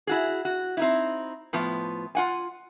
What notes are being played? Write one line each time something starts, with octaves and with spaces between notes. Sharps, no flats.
E4 F#4 G#4
F#4
C4 D#4 E4
A2 F3 B3
F4 F#5 G#5